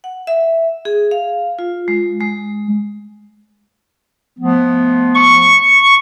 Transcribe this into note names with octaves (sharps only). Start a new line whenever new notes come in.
F#5
E5
G#4
F5
F4
G#3
G#3
F3 A3 B3
C#6